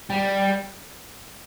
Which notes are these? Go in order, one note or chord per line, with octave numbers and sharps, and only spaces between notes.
G3